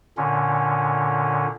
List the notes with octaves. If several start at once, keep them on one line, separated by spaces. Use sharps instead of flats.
A#2 D3 C#4